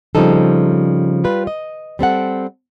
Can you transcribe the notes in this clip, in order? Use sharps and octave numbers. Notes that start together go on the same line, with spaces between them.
C#3 F3 G3 C4 D#4 A4
G3 F4 B4
D#5
G3 C4 A4 F#5